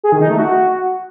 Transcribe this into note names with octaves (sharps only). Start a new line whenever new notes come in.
G#4
D#3
D#4
A3
F#4